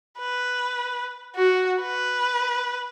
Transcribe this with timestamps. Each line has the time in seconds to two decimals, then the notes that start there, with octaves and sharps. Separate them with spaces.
0.19 B4
1.35 F#4
1.82 B4